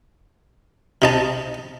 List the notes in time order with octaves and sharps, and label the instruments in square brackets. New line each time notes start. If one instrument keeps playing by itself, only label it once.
[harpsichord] C3 D#4 A5